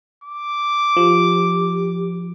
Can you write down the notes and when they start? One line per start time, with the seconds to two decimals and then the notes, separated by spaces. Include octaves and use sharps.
0.24 D6
0.97 F3 G4